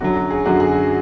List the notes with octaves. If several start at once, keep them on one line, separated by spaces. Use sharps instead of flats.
F#2 D3 F#3 F#4
F#4
G#4
F#2 D3 F#3 F#4
G#4